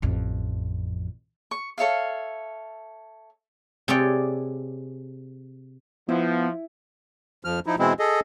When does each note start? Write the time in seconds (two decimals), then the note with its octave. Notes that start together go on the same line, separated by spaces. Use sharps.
0.02 A1 F2
1.51 C#6
1.78 A4 C#5 E5 F5
3.88 C3 G#4 A4 C#5 D5 G5
6.09 F3 B3 E4
7.45 F2 F3 F6
7.66 F3 D#4 E4
7.79 B2 E3 G#3 C4 E4
7.99 G#4 A4 D#5